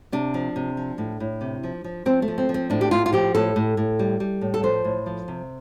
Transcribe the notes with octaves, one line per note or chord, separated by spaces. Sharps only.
C3 D4
F3
C3
F3
A2
A2
C3
F3
F3
F3 C4
A3
F3
C4
F3
C4
A2 D4
G4
A2 F4
F4
F3 G4
A2 A4
A2
A2
G3
G3
A2
A4
F3 C5
A2
F3
C3